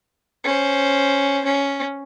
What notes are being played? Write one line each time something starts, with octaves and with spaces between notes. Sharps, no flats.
C#4 C5
C#4